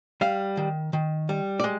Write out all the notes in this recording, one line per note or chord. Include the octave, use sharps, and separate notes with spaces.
G3 F5
D#3
D#3
G3
D5
G#3